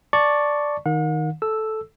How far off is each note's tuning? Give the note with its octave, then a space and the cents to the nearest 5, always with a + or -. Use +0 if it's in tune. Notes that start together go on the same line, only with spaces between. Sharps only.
D5 +0 A5 +0 C#6 +0
D#3 +0 F#5 -45
A4 -10 E6 +0